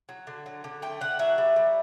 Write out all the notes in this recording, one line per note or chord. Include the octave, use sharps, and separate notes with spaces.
F#3
D3
F#3
D3
A3 G5
D3 F#5
F#3 E5
G3
G3